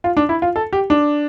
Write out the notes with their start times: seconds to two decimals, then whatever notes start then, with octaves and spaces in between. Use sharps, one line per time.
0.04 F4
0.17 D4
0.29 E4
0.42 F4
0.56 A4
0.73 G4
0.90 D4